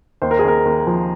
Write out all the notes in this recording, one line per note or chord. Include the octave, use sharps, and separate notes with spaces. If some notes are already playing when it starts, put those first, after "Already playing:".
D#2 C5
A#4
G#4
D#2 A#4
D#2
F3